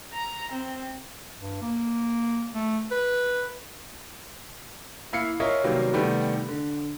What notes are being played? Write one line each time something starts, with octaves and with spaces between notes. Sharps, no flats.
A#5
C4
G2
A#3
A3
B4
A#3 E4 F5 C7 C#7
C#4 F4 A#4 C#5 D#5 E5
C3 D#3 F#3 G3 A#3 B3
C3 D#3 G3 A3 B3
D3